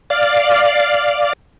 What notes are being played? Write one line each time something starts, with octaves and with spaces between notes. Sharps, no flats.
D5 F5